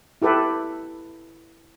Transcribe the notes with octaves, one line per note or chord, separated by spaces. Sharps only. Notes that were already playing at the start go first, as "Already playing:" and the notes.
E4 G4 A4 B4